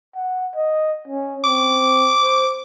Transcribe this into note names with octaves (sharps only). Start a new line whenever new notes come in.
F#5
D#5
C#4
C4 D6
C5